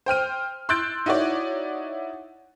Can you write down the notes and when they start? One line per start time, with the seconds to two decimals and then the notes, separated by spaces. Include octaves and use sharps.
0.06 C5 G5 F6 D#7
0.69 C6 E6 F#6 G6 A6 D7
1.06 D#4 E4 F#4 C#5 D5